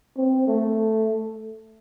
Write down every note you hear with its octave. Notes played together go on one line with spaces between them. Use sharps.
C4
A3